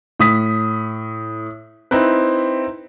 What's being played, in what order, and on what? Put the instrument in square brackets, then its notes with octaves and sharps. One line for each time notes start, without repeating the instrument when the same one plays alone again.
[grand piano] A2 D#6 B6
C4 D#4 E4 B4